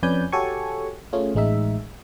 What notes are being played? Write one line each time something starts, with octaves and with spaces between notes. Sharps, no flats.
F2 C#4 B4 D5 G#5 G6
F#4 G4 A4 C#5 G#5 C#6
A3 C#4 F4 G#4
A1 G#3 D#4 E5